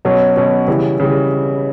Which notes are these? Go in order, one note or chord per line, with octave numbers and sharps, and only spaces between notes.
B2 F#3 C#4
B2 F#3 C#4
C#3 E3 G3
C#3 E3 G3